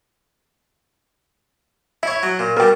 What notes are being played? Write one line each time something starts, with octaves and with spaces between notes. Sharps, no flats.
E4 C#5 E5
F#3
A#2
B2 G3 A#4 G5